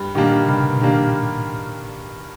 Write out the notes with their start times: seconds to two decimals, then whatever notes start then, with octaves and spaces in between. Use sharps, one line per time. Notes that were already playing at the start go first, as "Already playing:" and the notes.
Already playing: G2
0.15 A#2 D#3 G3 A#3 D4
0.44 C#3
0.48 G2 C3
0.70 B2
0.81 D#3 G3 A#3 D4
0.93 A#2
1.15 A2